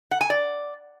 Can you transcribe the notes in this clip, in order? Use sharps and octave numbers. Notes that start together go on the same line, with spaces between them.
F#5
G#5
D5